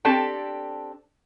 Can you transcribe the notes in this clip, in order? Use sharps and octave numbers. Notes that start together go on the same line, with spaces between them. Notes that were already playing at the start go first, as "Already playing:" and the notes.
C4 D4 G4 A4 A5